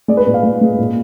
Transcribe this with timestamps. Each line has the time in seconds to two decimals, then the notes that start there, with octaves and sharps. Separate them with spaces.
0.08 G#3 D5
0.17 B4
0.26 A#2
0.34 F5
0.43 G#3
0.61 G#3
0.78 A#2